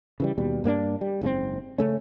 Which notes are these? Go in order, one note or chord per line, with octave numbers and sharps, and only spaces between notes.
C#3 E3 G3
D#2 B2 G3
G2 A#3 C4 D4
G3
F#1 G#2 C#3 C4
C#3 A3 C#4